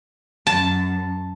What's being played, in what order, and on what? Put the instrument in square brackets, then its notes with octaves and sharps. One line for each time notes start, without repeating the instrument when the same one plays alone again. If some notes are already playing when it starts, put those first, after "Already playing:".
[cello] F#2 [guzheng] A5